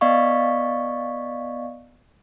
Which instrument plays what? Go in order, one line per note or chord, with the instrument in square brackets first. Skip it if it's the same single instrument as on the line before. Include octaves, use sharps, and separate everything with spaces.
[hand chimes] B3 D5 D#5 F5 C#6